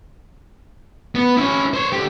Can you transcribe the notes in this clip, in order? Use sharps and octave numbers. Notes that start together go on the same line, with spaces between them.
B3
C#4 E4
C5 C#5
D3 G4